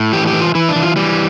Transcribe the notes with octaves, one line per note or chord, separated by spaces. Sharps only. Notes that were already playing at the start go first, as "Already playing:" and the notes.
Already playing: A2
E3 G4
G4
E3
F4
E3 E4
D4
E3
F4
E3 G3